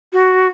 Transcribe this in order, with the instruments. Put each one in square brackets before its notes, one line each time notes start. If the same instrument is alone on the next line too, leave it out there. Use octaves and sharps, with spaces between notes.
[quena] F#4